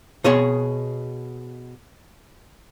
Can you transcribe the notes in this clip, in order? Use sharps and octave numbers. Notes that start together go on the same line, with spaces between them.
B2 G#4 C#5 C6